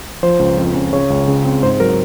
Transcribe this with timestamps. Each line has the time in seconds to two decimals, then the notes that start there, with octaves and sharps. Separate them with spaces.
0.23 F3 C5
0.39 C#2
0.57 F2
0.75 C#4
0.92 C#3 C#5
1.10 C#2
1.28 C#3
1.45 C4
1.63 G#2 C5
1.80 F#3 A#4